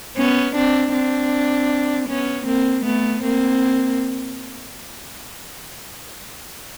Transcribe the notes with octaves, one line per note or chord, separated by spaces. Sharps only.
B3 C#4
C4 D4
C4 D4
B3 C#4
A#3 C4
A3 B3
A#3 C4